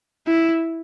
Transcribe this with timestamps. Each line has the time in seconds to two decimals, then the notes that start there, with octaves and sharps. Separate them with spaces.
0.27 E4